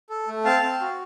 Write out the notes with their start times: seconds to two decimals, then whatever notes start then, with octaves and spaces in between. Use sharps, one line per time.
0.10 A4
0.27 A3
0.45 C4 F5 A5
0.62 C4
0.81 F#4